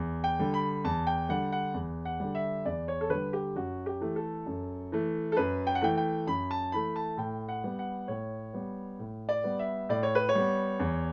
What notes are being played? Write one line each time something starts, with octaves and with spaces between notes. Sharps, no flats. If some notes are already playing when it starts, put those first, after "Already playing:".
Already playing: E2
G5
D3 G3
B5
E2 A5
G5
D3 G3 F#5
F#5
E2
F#5
D3 G3
E5
E2 D5
C#5
A4
D3 G3 B4
G4
F#2 F#4
G4
E3 A3
A4
F#2
E3 A3
A4
F#2 B4
G5
F#5
E3 A3 G5
G5
F#2 B5
A5
E3 A3 B5
A5
A2 G5
F#5
G3 B3
F#5
A2 C#5
G3 B3
A2
D5
G3 B3
E5
A2 D5
C#5
B4
C#5
G3 B3
E2